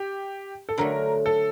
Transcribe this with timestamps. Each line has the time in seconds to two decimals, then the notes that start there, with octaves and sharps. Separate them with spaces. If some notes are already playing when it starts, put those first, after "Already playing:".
Already playing: G4
0.69 A4
0.78 D3 F#3 A3 A#4
1.26 A4